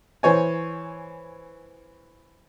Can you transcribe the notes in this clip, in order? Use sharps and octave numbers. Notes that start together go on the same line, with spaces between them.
E3 C5 C#5 G#5